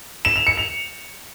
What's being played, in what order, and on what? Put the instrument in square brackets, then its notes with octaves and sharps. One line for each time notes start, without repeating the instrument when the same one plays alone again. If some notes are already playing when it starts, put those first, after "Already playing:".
[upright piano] E7
F7
C#7
F7